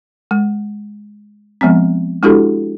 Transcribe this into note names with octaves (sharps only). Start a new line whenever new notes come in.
G#3
F3 G#3 B3 C4
G#3 D4 E4 F#4 G4 A4